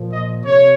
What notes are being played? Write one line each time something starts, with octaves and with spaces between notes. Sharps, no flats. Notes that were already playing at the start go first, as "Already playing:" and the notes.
Already playing: A#2 F3
D#5
C3 C#5